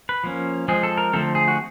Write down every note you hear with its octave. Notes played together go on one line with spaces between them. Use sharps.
B4
F3 A#3 C#4
F3 G#3 C4 G#4
A4
A#4
D3 F3 A3 C4 A4
G#4
F#4